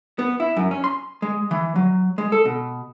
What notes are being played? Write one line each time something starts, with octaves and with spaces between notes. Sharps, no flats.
B3
E4
F#2
C#4
C6
G#3
E3
F#3
G#3
A4
B2